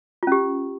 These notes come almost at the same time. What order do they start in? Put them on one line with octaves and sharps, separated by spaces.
F4 C#4 G4